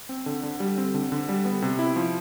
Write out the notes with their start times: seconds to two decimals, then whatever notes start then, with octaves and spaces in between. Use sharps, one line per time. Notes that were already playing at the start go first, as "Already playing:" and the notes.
0.09 C4
0.26 D3
0.43 D3
0.60 G3
0.78 C4
0.94 D3
1.12 D3
1.29 G3
1.45 B3
1.62 C3
1.79 E4
1.96 F3